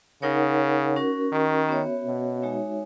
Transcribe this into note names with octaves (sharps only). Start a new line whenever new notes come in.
C#3 D#4 A#4 C#5 F#5
C#4 F#4 A#4
D#3
B3 F#4 C#5 E5
B2
G#3 D#4 F#4 C#5 E5